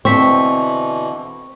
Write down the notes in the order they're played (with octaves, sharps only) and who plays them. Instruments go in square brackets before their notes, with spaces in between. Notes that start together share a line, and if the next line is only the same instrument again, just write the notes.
[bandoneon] B2 D3 E3 [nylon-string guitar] C4 [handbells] C#6 B6